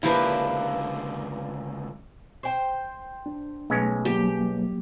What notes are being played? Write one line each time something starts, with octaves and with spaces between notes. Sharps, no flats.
C#2 D3 F3 A#3 D4 E4 G4 B4
C5 G5
D4
B1 G#3 A3 C#4
F#3 G3 A#3 G4